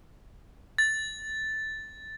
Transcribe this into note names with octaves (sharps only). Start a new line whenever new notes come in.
A6